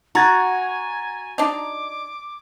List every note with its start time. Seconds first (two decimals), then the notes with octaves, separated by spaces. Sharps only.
0.15 F#4 G#5 A#5 G#6 A6
1.38 D4 D#4 D6